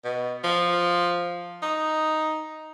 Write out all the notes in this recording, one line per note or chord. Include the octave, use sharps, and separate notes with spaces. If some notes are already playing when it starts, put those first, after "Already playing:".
B2
F3
D#4